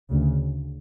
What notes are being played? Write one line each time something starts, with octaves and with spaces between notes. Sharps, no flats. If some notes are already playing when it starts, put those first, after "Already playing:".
D2 C#3